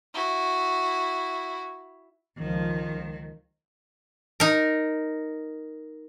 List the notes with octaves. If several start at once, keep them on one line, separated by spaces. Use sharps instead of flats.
E4 F#4
C#2 D#3 F3
D#4 A#4